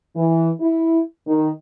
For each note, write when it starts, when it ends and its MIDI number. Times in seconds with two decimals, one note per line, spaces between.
0.16 0.50 52
0.61 1.00 64
1.26 1.49 51